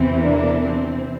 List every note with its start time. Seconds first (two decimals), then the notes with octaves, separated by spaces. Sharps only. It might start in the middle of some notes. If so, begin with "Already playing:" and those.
Already playing: E2 C3 E3 C4
0.22 A#3 D4
0.63 C4